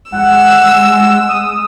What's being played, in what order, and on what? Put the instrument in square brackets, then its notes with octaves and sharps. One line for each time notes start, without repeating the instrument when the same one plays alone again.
[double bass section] G#3 [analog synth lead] F#5 [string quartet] E6
[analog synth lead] D#6